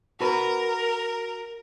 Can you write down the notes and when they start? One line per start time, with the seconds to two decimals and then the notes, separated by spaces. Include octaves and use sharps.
0.21 F#4 A#4 B4